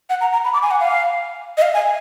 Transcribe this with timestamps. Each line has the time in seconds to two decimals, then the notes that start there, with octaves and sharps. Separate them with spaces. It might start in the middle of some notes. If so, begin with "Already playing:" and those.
0.10 F#5
0.21 A#5
0.33 A#5
0.44 B5
0.54 D6
0.62 G#5
0.71 F#5
0.80 F5
1.58 D#5
1.62 F5
1.74 G#5